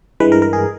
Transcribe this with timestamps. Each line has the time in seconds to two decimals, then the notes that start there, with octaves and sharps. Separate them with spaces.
0.20 G2 E3 G#3 B4
0.32 A#4
0.42 A#4
0.53 G#4